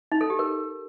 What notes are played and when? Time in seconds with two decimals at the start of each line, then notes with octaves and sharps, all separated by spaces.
0.12 D#4
0.21 A4
0.30 G4
0.39 A#4